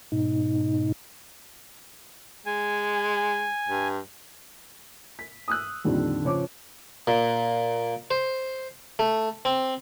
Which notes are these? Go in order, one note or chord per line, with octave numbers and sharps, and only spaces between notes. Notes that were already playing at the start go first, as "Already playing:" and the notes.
G#2 B2 D#4
G#3 G#5
G2
B6
D#6 E6 F#6
F2 A#2 D3 D#3 G3
C#3 F3 C#5 D6
A#2
C5
A3
C4